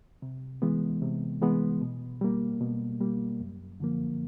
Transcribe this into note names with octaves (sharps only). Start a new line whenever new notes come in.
C3
E3 G#3 B3
C3
E3 G#3 B3
B2
G3 A#3
B2
G3 A#3
F#2
D3 F3 A#3